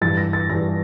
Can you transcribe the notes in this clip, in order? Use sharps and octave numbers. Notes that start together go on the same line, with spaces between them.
G2 E3 G3 A6
A#6
A6
G2 E3 G3 A#6